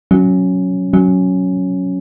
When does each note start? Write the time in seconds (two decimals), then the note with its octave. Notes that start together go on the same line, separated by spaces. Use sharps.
0.11 F#3 C#4
0.93 F#3 C#4